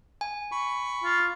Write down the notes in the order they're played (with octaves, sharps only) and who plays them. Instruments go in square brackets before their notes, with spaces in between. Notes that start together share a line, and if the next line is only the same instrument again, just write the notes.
[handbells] G#5
[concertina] B5 C#6
[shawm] F4